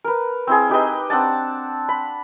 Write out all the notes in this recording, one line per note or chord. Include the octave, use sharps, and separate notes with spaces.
A#4 B4
C4 E4 G#4
D#4 G4 B4 D#5
C4 D4 F#5 A5
B5